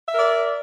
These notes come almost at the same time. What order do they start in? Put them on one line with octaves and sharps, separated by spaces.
E5 A#4 D5